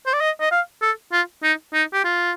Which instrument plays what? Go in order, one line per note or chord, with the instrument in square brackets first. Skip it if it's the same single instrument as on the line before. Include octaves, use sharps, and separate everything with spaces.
[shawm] C5
D5
D#5
D#5
F5
A4
F4
D#4
D#4
G4
F4